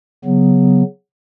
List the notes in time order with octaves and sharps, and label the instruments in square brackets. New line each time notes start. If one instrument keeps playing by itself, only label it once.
[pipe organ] C#3 F#3 B3